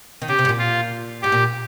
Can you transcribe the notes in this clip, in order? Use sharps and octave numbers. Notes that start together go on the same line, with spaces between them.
D#3
C#3 G4
C3
G#2
A#2
F4
G#2 G4
A#2